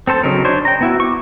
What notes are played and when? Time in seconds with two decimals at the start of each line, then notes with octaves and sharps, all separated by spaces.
0.07 C4 A4 C5 A5
0.23 C#3 F#3 D#4 A#4
0.45 D4 C5 C#5
0.65 G5 A#5
0.81 B3 E4 F#4
1.00 C#6 D6